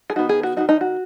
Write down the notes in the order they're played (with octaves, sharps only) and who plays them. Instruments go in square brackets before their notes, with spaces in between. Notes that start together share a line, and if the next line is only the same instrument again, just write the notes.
[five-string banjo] G#4
D#3 B3 D#4 F#4
G#4
F#4
D#3 F#3 D#4 F#4
D#4
F#4